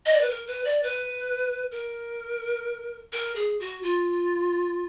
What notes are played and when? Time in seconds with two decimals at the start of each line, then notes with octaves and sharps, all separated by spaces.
0.06 D#5
0.13 D5
0.21 B4
0.30 A#4
0.47 B4
0.65 D5
0.83 B4
1.72 A#4
3.13 A#4
3.36 G#4
3.60 F#4
3.83 F4